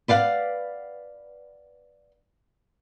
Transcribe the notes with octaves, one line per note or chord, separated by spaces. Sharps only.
B4 D5 F5 F#5